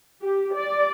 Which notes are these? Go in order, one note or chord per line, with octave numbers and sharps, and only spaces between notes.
G4
D5